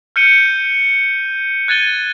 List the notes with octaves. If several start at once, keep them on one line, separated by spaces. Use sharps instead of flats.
F6 G6 C#7 D#7 G7
F#6 G#6 A6 D#7 G7